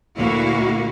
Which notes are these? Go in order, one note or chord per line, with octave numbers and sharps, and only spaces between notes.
D2 A#2 A#3 E4 F#4 F5